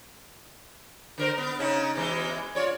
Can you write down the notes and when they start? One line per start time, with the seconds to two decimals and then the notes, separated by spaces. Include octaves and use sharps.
1.18 D3 A#4 C5
1.38 B3
1.59 C#3 C#4 D#4
1.95 B2 E3 G#3
2.55 F4 C#5 D5